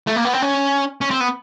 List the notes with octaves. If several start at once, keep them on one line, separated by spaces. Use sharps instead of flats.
A3
A#3
B3
C4
C#4
C#4
C4
B3